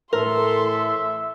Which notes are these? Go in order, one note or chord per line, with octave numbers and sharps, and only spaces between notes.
A2 E3 A4 A#4 E5 C6